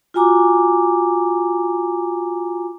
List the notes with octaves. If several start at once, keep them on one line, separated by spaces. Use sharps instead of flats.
F4 F#4 G#5 A#5 D6